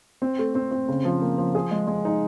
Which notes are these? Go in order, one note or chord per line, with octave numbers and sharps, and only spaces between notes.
C4
A3
C4
C4
C#3
F3
A#3
F3
G#4
G#3
G#3
D#4